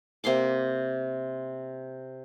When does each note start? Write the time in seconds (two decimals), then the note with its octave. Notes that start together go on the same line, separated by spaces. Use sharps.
0.24 C3 A#3 C6 D6